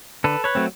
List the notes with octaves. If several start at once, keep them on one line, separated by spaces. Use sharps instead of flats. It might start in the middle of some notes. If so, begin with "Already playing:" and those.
D3 A4 B4
B4 C#5
F#3 A3 C4